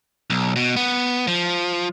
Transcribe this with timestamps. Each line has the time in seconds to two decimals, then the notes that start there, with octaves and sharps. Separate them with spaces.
0.30 B1
0.56 B2
0.76 B3
1.28 F3